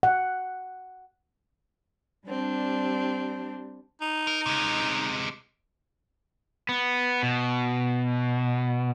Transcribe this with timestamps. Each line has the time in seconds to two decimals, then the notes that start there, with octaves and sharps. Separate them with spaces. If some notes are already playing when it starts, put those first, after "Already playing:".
0.03 F#5
2.27 G3 C4 D4
4.01 D#4
4.27 A#4
4.46 C3 G#3
6.69 B3
7.23 B2